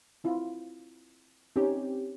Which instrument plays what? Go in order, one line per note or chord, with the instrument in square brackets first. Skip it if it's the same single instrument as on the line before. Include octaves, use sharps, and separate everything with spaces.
[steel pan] C4 E4 F4
[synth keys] C4 G4 [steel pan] C#4 D#4